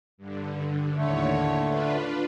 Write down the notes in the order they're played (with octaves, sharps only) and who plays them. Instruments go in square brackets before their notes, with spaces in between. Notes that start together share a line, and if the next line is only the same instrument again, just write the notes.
[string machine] G2 D3
[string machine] D#2 A2 C#5 [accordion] D3 A3
[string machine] D4 F4 B4